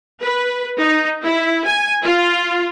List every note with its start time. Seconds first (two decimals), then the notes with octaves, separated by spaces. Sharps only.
0.22 B4
0.80 D#4
1.24 E4
1.66 G#5
2.05 F4